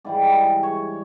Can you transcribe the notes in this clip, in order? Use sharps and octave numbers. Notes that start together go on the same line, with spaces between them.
G#2 E3 G3 D5
C#5